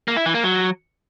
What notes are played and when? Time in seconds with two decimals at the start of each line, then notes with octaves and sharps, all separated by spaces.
0.08 A#3
0.17 E4
0.26 E3
0.35 A#3
0.43 F#3